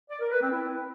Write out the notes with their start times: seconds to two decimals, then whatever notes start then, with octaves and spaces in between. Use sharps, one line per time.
0.10 D5
0.20 A#4
0.31 B4
0.41 C4
0.51 E4